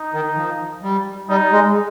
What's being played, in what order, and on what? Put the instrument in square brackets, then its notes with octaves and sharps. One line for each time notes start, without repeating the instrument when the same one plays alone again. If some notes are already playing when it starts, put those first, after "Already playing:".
Already playing: [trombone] D#4
[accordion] D#3
F3
G3
[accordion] G3 [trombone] D#4
[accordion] G#3